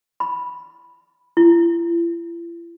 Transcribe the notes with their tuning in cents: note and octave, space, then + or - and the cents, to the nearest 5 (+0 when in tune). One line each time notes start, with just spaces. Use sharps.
B5 -5
E4 +45